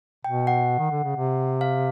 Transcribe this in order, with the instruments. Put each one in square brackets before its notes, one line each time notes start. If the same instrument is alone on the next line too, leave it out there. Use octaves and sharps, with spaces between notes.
[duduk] B2 [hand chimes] G5
[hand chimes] F#5
[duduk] D#3
D3
C#3
C3
[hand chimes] F5